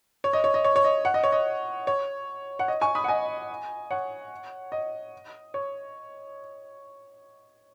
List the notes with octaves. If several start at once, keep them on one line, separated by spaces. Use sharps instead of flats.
C#5
D#5
C#5
D#5
C#5
C#5
D#5
F#5
D#5
C#5
D#5
C#5
F#5
D#5
G#5 C#6
B5 D#6
F#5
D#5 G#5
C#5 F#5
D#5
C#5